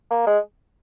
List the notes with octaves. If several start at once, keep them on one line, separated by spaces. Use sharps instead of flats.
A#3
G#3